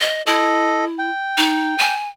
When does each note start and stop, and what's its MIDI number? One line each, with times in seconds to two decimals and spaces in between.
0.01 0.22 75
0.27 1.10 64
0.27 0.85 69
0.27 0.85 75
0.99 1.94 79
1.38 1.77 63
1.78 2.09 80